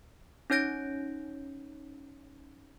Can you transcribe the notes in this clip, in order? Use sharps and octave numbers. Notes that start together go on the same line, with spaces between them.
C#4 D#4 C#5 G6 A#6 D7